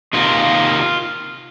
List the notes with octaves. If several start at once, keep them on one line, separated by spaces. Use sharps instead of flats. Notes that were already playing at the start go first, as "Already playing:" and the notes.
C3 D#3 A#3 F4